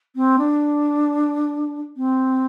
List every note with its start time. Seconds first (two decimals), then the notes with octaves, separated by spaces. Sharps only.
0.16 C4
0.38 D4
1.97 C4